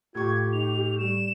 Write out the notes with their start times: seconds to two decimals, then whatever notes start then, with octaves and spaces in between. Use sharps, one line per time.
0.15 A2 F4 G4 C#6 G#6
0.53 D#4 F7
0.98 G3 E7